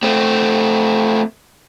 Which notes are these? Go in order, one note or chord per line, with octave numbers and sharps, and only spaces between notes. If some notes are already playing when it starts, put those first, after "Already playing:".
A3 C4